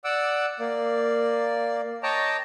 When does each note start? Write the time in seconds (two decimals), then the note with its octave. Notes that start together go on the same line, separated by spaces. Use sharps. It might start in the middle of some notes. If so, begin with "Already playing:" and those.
0.04 D5 F#5 D6 E6
0.59 A#3 D5
2.03 C#5 D#5 G5 A5 A#5 D6